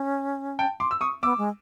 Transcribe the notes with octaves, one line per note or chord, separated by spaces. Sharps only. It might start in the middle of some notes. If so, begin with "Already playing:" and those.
Already playing: C#4
G5 A5
C6 D6
E6
C#6 D#6
B3 D6 E6
G#3